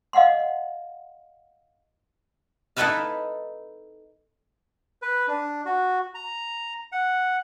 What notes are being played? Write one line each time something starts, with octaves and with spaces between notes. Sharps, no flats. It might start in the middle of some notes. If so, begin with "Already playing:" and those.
D#5 F5 F#5 C6
D#4 E4 A4 B4 E5 F5
B4
D4
F#4
A#5
F#5